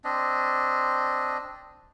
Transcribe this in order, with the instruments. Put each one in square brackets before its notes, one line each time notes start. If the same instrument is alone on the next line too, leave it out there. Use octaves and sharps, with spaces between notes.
[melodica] C4 D4 D#5